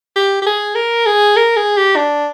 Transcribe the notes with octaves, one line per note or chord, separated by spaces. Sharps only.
G4
G4
G#4
A#4
G#4
A#4
G#4
G4
D4